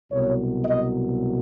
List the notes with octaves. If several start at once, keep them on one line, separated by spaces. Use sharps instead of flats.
C2 B2 F#3 C#5
D#5